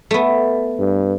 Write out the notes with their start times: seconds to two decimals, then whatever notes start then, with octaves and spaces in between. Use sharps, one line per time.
0.11 A3 B3
0.79 G2